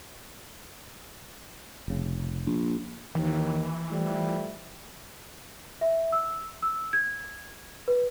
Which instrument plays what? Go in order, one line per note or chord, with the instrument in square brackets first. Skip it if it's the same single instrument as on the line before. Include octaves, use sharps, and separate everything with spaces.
[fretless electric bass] F1 C#3
[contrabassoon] A#1
[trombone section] D#2 D#3 [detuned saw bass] E3
[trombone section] F3 G3 A3
[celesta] E5
E6
E6
G#6
B4